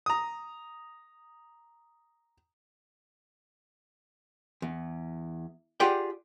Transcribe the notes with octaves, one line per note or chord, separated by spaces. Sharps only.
A#5 D#6
E2
F4 G4 G#4 D5 F#5 G5